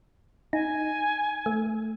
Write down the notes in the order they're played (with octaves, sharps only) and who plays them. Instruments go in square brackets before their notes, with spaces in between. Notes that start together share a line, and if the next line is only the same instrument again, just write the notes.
[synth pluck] D#4 [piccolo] G#5
[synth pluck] A3